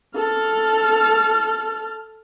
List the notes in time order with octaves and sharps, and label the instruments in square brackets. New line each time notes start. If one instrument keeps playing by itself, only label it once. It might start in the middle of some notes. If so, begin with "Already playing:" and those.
[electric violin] A4 F6